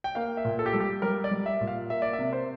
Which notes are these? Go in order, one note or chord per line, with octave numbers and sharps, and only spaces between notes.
G5
A#3 F5
E5
A#2
A4
G4
G3 A4
G4
G3 A#4
D5
G3
E5
A#2
F5
A#3 E5
D5
E5
C3
C5